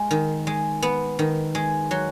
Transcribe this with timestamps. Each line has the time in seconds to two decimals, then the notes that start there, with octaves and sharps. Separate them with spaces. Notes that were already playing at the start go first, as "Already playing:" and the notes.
Already playing: G#3
0.11 D#3
0.47 G#3
0.82 B3
1.19 D#3
1.55 G#3
1.91 F#3